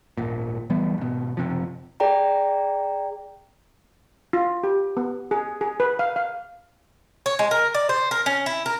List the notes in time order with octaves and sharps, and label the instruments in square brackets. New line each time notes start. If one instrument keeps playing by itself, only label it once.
[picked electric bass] D#1 G#1 A#2
D1 E3 G3 B3
G#1 B2
F#1 C3 F3
[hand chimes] G#4 D5 G5 A#5
[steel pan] F4
G4
B3
G#4
G#4
B4
F5
F5
[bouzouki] C#5
G#3
A#4
D5
C5
A#4
C#4
E4
A#4